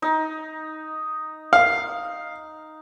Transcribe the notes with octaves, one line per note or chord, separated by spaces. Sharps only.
D#4
F5